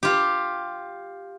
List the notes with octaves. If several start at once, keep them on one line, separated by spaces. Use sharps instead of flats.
F4 G4